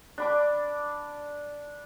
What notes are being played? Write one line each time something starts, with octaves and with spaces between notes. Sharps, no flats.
D4 B5 D6